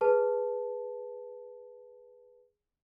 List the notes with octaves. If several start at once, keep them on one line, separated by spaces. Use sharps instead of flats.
G#4 B4 A5